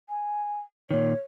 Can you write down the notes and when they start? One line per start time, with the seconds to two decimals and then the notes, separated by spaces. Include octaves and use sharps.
0.09 G#5
0.91 A#2 D#3 C#5